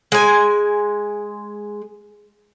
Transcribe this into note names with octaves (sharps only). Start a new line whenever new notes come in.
G#3 G#5